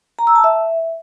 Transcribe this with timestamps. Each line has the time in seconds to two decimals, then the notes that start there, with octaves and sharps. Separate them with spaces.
0.19 A#5
0.27 E6
0.36 A5
0.44 E5